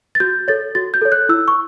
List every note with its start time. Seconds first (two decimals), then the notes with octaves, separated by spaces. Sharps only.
0.15 A6
0.20 F#4 G6
0.48 A4 C#5 A6
0.75 F#4 A6
0.94 G6
1.02 A4 C#5
1.12 F#6
1.29 E4 E6
1.48 C#6